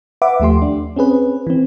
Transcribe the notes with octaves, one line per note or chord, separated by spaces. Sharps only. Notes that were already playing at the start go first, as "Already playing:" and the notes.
B4 E5 F#5 D6
D#2 F3 A3 G4 C6
D4
C4 C#4 G#4 B4
E3 C4